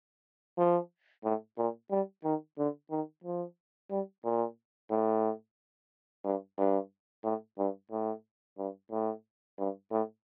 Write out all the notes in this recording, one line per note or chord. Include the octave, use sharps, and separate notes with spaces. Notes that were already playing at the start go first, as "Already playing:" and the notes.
F3
A2
A#2
G3
D#3
D3
D#3
F3
G3
A#2
A2
G2
G2
A2
G2
A2
G2
A2
G2
A2